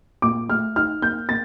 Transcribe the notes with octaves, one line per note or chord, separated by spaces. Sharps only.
A#2 D6
A3 F6
D#4 F6
A#3 G6
A#3 A6